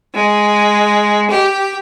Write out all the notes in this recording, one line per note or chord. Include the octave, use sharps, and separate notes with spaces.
G#3
G4